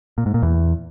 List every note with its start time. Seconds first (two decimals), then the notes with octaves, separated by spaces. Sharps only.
0.18 A#2
0.26 G#2
0.34 A#2
0.42 E2